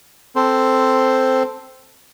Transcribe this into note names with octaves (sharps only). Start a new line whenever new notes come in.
C4 A4 C5